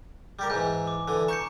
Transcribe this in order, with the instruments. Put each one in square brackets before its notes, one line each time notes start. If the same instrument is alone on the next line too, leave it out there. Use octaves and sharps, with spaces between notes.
[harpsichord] G3 G4 A#4
[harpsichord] G#2 E3 [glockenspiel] G#5 G6
[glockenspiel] D6
[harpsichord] D3 E3
[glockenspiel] A#5 G6 C#7 [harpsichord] C#6